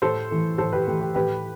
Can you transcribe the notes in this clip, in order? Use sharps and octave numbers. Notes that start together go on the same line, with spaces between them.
A2 A4 C5
E3 A3
A2 A4 C5
G4 B4
E3 A3 G4
G4
A2 G4 B4